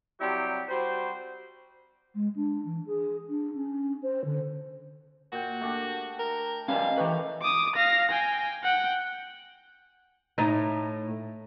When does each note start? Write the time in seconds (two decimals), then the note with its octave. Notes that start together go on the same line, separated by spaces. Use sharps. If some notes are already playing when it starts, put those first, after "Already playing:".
0.20 C3 F#3 G3 E4 G4
0.69 G3 F#4 C5
2.15 G#3
2.35 D4
2.65 E3
2.86 G#4
3.29 D4
3.55 C#4
4.03 C5
4.24 D3
5.32 A#2 F#4 G5
5.61 A3 D4 G4
6.19 A#4
6.68 D#3 G3 C#4 B4 D5 F5
6.97 E3 A3 G4 B4 A#5
7.42 D6 D#6
7.75 F5 A#6
8.11 G5 G#5
8.63 F#5 G5
10.38 A2 D#4